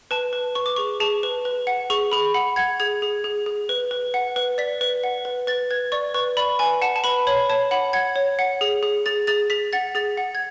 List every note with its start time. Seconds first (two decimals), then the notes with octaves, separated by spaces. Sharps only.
0.11 B4 A5
0.33 B4
0.55 B4 C#6
0.66 D6
0.76 G#4 C#6
1.00 G#4 A5
1.23 B4
1.45 B4
1.67 F#5
1.90 G#4 C#6
2.12 G#4 B5
2.34 F#5 B5
2.56 F#5 G#6
2.80 G#4 G#6
3.02 G#4
3.24 G#4
3.46 G#4
3.69 B4
3.91 B4
4.14 F#5
4.36 B4
4.58 D5 B6
4.81 B4
5.04 F#5
5.25 B4
5.47 B4 A6
5.71 B4 G#6
5.92 D5 C#6
6.14 B4 C#6
6.37 D5 B5
6.59 B4 G#5
6.82 F#5 A5
6.96 A5
7.04 B4 B5
7.27 C#5 B5
7.50 C#5 A5
7.71 F#5 B5
7.93 F#5 G#6
8.16 C#5
8.39 F#5
8.61 G#4
8.83 G#4
9.06 G#4 A6
9.27 G#4 A6
9.50 G#4 B6
9.73 F#5 A6
9.95 G#4 A6
10.17 F#5
10.35 G#6